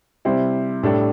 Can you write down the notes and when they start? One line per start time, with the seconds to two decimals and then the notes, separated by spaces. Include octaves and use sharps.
0.25 C3 G3 E4 C5
0.83 A2 G3 D4 A4